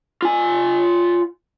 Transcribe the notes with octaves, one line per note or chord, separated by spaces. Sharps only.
F4 G#5